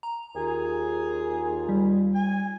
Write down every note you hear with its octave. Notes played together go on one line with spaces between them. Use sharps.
A#5
D#2 F4 G#4
G3
G#5